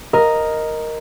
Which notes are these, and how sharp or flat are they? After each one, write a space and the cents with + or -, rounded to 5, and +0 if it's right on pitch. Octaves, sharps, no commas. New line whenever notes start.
A#4 +0 D#5 +0